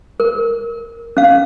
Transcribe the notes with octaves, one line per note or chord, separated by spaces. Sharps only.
A#4
C#4 F5